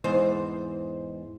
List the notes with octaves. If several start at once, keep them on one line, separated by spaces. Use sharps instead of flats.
E2 G#2 C5